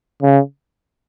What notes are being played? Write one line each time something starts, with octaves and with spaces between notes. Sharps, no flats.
C#3